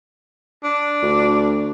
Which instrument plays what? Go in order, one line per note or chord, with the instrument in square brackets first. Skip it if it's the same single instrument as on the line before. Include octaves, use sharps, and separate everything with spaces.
[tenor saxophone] D4
[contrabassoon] D2